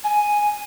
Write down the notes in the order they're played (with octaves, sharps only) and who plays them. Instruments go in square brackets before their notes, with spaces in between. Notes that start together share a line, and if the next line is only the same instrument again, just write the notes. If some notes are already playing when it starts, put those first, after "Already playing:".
[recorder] G#5